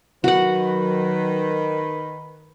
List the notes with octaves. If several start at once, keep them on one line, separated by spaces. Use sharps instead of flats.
D#3 F#3 F#4 B4 F#5